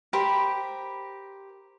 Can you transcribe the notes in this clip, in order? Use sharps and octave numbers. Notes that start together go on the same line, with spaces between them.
G4 A#4 C5 B5